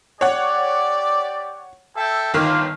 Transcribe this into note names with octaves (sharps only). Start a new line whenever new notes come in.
G4 C#5 D5 F#5
A4 E5 G5
G1 D#3 A#3 F4 F6